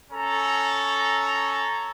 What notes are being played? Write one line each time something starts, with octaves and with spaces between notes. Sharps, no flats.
C#4 A4 A#5